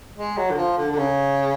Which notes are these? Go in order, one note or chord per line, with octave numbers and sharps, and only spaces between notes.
G#3
F#3
D3
F3
D3
D3
C#3